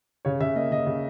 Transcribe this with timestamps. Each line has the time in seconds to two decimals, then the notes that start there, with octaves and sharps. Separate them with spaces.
0.25 C#3 C#5
0.40 C#3 E5
0.55 A#3 D#5
0.71 C#3 D#5
0.87 C#3